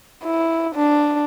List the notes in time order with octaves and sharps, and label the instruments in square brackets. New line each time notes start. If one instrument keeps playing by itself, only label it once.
[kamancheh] E4
D4